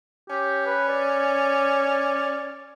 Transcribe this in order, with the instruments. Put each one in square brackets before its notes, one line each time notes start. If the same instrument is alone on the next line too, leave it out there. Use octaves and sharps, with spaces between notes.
[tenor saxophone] C#4 [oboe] G4
[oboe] B4
D5
D5